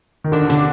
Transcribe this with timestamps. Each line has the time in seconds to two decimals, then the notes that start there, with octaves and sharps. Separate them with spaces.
0.24 D#3
0.32 D3 D4
0.49 D3 D4